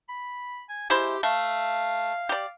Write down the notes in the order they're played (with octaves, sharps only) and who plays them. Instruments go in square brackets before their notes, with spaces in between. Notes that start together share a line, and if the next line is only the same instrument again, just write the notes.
[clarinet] B5
G#5
[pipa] G#3 E4 C5 [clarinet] G4
[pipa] A3 [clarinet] F5
[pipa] G4 D5